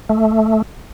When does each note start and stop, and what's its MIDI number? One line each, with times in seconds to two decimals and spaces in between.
0.09 0.62 57